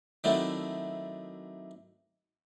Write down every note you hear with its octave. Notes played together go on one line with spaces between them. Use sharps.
D#3 F#3 A3 C4 D4 E4